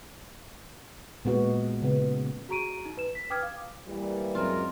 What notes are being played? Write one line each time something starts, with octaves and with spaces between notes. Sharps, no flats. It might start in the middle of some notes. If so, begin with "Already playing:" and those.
A#2 G#3 B3 F#4
C#3 B3
F#4 G#4 A#5 C#6 D7 D#7
D#4
B4 E7
B6
B4 G5 D6 D#6 F6 G#6
F5 D6
E3 G3 A#3
F#2 G#3 C4 F4 A#4